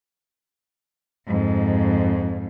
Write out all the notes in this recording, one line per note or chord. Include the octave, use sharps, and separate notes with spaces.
F2 G#2